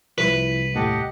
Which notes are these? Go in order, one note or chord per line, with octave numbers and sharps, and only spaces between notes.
C2 F3 E4 B4
D#2 A2 G4 D#5 F#5 A5